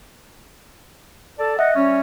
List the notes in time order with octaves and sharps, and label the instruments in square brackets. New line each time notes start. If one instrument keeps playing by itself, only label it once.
[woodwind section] A4 D5 A5
[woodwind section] D#5 F#5 [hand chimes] E5
[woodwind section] G3 C#4